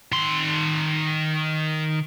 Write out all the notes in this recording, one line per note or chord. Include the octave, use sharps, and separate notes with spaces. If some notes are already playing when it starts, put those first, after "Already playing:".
D#3 C6